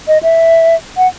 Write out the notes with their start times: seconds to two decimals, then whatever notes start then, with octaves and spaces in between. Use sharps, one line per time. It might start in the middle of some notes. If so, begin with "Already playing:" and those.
0.08 D#5
0.23 E5
0.97 F#5